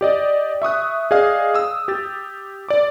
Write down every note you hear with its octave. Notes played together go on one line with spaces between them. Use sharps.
G4 D5 D#5
E5 C#6 D#6 F#6
G#4 D5 D#5 F5
D#6 E6
G4 A6
D5 D6